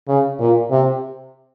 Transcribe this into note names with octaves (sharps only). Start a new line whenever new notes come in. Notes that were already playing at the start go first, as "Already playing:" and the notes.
C#3
A#2
C3